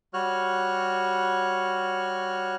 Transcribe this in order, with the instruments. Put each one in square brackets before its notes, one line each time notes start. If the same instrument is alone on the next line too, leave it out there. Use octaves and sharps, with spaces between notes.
[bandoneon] G3 F#4 C#5 F6 F#6